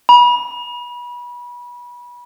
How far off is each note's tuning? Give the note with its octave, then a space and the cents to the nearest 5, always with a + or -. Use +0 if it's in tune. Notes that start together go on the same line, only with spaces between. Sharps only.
B5 -30